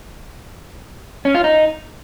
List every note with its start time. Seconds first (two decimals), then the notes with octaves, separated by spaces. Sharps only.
1.25 C#4
1.35 F4
1.44 D#4